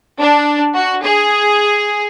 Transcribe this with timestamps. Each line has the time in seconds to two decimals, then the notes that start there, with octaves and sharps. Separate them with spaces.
0.18 D4
0.74 F#4
1.03 G#4